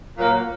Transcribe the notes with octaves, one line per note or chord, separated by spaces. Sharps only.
A#2 F#3 A#3